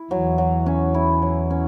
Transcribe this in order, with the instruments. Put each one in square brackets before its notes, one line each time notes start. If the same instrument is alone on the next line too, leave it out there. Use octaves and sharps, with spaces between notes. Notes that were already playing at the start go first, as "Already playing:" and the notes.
Already playing: [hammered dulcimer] E4
[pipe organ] E2 E3 [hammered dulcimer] F#3
[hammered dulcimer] F#3
C#4
E4
F#3
C#4